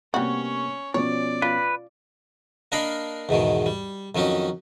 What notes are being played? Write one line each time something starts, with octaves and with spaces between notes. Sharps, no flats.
C3 G3 A#3 B3 C#4 F#4 C#5
B2 F3 C#4 C#5 D5
F4 B4
A#3 D4 A#4 D#5 F5 B5
E2 G#2 B2 D#3
G3
F2 D#3 F#3 C#4 D#4